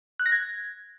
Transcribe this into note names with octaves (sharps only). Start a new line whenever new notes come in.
F#6
A#6
G#6